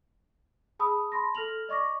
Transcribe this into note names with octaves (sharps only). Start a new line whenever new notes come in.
G#4 A5 B5 D#6 E6
A5 B5 C6 A#6
A4 F6 A#6 F7 F#7
D5 D#5 C#6 D6 A#6